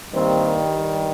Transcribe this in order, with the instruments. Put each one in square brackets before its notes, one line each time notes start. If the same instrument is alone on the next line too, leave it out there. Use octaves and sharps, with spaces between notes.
[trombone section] G2 D#3 G3 A#3 C4